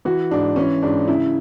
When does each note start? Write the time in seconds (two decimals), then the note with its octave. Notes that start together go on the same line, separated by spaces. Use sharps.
0.05 E3 F#4
0.31 G#2 D4
0.56 E3 C#4
0.83 G#2 D4
1.08 C#3 E4